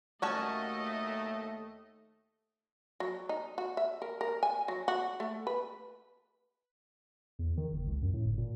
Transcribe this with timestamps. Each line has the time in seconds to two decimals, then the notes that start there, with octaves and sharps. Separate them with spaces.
0.22 D#2 A3 C#4 F#4 D#5 A5
3.00 F#3
3.29 D#4
3.58 F#4
3.77 E5
4.02 A#4
4.21 A#4
4.43 G#5
4.68 F#3
4.88 F#4
5.20 A3
5.47 B4
7.39 E2
7.57 D#3
7.72 F#1
7.87 C#2
8.02 F#2
8.14 A2
8.25 G1
8.38 A#2